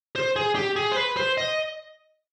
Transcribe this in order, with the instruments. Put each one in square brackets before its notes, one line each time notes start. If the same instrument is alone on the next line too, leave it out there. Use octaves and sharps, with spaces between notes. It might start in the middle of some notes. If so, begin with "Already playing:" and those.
[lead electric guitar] C5
G#4
G4
G#4
C5
B4
C5
D#5